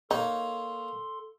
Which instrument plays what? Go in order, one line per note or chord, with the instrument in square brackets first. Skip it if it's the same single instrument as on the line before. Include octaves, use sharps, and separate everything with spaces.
[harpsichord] A#3 C#5 [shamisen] D#4 [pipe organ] A4 C6